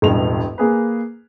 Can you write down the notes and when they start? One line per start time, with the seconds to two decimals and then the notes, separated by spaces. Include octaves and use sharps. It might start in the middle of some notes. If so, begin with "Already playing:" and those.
0.02 E1 A1 G2 F7
0.58 A#3 G#4 B4